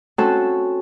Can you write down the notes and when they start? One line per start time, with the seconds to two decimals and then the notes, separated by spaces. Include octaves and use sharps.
0.18 C4 C#4 F#4 A4 A5